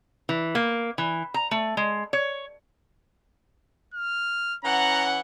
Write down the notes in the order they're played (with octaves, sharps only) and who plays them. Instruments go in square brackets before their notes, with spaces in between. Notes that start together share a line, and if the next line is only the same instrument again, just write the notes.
[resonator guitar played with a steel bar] E3
A#3
E3
A#5
A3
G#3
C#5
[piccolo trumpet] F6
[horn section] E3 C#4 F#5 [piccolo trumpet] A#5